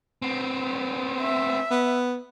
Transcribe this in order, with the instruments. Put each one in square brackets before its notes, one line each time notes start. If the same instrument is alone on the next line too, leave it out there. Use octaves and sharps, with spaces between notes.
[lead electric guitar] B3 C4
[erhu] E5
[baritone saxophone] B3